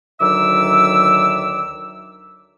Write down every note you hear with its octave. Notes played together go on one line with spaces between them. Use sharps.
D2 D#3 F#3 E5 D6 E6